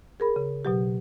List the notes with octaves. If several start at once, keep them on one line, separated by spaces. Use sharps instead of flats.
G#4 A#4 B5
C#3
B2 F#3 G4